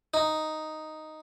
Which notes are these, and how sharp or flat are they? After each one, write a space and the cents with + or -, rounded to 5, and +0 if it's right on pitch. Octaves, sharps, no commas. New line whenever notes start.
D#4 +0